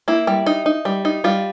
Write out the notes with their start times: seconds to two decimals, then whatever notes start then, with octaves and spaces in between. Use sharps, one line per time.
0.08 A#3 E4
0.27 G3
0.46 D#4
0.66 D#4
0.85 G3
1.05 D#4
1.24 G3 F4